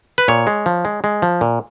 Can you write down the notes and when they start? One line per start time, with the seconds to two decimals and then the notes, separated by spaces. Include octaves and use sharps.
0.18 B4
0.28 A#2 C#5
0.47 G#3
0.66 F3
0.85 G#3
1.04 G#3
1.22 F3
1.41 A#2